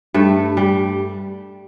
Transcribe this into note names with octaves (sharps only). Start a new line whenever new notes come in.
G2 A3
G3